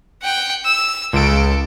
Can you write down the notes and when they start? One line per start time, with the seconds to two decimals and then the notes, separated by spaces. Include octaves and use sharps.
0.22 F#5 G5
0.65 E6
1.13 C#2 A4 D7